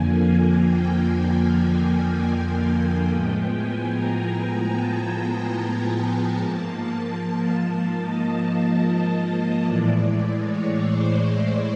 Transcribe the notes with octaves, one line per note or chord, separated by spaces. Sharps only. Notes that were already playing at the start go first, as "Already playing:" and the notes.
Already playing: F2 D3 F3 A#3 G#5
G5
A2 F3 G#3 B3 G5
G#5
A#5
A5
A#5
G#2 F3 A#3 A5
D#5
A2 E3 G#3 D5
C#5
C5